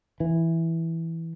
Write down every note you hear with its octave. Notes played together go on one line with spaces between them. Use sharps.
E3